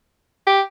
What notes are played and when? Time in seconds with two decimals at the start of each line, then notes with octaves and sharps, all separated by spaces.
0.47 G4